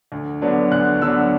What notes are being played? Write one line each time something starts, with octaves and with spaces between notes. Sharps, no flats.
D2
D3 F#3 B3 D4
D2 F#6
D3 F#3 B3 D4 E6